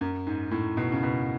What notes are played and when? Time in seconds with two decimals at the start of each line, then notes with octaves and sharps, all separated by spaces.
0.01 F#2
0.27 G#2
0.51 A2
0.77 B2
0.92 C#3
1.03 B2